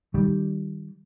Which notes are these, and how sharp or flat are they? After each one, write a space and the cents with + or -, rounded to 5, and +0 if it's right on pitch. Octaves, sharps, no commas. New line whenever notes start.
D#3 +0 G3 +0